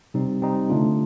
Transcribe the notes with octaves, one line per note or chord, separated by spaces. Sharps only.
C3 G3 C4 D#4
C3 G3 C4 D#4
D3 A3 D4 F4